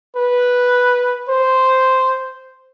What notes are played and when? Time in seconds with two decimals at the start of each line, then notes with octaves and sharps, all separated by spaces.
0.16 B4
1.29 C5